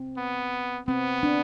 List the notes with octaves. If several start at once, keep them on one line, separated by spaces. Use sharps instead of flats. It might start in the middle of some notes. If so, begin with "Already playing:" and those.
Already playing: C4
B3
B3 C4
D4